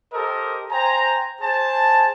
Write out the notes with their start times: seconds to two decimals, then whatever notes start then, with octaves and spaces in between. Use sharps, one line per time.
0.13 G4 A4 A#4 C5 D#5
0.71 C5 G5 G#5 A#5
1.41 G#4 C5 A5